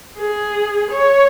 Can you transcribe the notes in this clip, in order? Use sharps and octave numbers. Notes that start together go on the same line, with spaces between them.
G#4
C#5